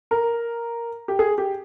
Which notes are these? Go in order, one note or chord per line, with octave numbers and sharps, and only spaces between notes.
A#4
G4
G#4
G4